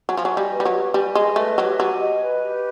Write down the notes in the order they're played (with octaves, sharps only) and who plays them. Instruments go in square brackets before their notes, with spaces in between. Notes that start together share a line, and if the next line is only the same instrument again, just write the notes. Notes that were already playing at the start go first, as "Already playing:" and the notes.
[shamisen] F#3 [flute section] G#5
[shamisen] F3
F#3
[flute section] D#5
[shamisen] G3
[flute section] B4
[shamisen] G3
F#3
[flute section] G4
[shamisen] G3 [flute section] G#5
[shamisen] G#3 [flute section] D#5
[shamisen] A3 [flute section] B4
[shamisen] F#3 [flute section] G4
[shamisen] F#3 [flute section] G#5
[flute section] D#5
B4
G4